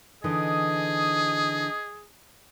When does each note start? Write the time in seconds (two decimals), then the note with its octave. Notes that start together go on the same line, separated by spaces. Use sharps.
0.24 D3 E3 D#4 G#4 D#5